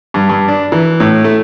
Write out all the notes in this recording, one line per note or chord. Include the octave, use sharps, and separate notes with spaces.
G2
G2
D4
E3
A2
A3